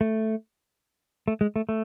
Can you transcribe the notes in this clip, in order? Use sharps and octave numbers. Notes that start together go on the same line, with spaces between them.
A3
A3
G#3
A3
A3